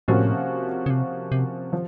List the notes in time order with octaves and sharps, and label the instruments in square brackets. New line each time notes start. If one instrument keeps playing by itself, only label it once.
[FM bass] A2 [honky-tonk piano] C3 F3 A#3 C#4 F#4
[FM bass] C#3
C3
C3
[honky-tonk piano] F3